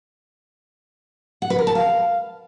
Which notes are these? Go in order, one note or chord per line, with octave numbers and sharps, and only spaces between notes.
F#5
B4
A#4
A5
F5